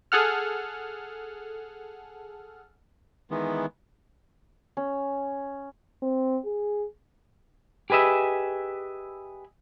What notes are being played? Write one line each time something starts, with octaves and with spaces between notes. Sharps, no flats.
G#4 A4 F#5 F6
D#3 E3 G#3 B3
C#4
C4
G#4
G4 G#4 B4 D#5 E5